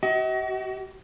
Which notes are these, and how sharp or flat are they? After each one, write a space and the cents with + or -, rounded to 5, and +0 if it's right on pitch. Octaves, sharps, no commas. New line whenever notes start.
F#4 +40 D#5 +45